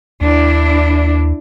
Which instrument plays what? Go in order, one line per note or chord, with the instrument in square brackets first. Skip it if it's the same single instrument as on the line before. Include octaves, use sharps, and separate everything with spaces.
[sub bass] D#2 [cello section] D4 E4